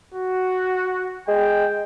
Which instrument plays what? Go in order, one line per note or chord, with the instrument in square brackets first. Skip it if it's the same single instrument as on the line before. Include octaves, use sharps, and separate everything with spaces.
[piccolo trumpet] F#4
[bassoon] G#3 [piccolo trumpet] G5